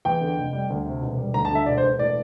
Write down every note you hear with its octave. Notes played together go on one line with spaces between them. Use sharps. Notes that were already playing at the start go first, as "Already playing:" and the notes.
E2 G5
D3
F1
G3
D2
C3
E1
G3
D2 A#5
A5
D3 E5
E1 D5
C5
E1
A2 D5